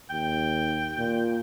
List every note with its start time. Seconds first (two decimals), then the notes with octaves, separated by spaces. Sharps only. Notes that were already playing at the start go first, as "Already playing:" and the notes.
0.10 D#2 G5
0.98 A#2